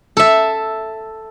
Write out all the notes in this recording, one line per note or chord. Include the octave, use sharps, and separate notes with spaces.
A4 E5